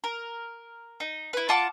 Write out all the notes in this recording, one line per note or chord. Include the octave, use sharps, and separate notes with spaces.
A#4
D#4
E4 B4
F4 F#5 A5 D6